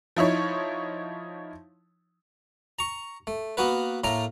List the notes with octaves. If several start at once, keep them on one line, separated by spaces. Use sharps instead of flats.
F3 D#4 E4 C#5
A#5 C#6
A3
A#3 B3 F#4 A#4 B4
A2 A3 A#3 A#4 A#5